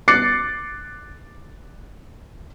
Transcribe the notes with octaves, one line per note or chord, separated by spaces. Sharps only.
D6 F#6 A6 C7 C#7